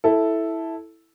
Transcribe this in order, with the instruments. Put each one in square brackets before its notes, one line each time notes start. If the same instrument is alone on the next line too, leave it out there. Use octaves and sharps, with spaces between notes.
[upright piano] E4 A4